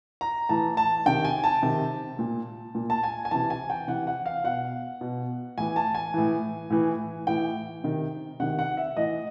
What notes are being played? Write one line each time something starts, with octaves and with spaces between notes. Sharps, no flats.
A#5
A2 E3 A5
A5
C3 D#3 G5
G#5
A5
C3 D#3
A#2
A#2
A5
G#5
G#5
C3 E3 A5
G#5
G5
C3 E3 F#5
F#5
F5
B2 F#5
B2
A2 E3 G#5
A5
G#5
A2 E3
A2 E3
A2 E3 G5
C3 D#3
C3 D#3 F#5
F#5
E5
A2 E3 D#5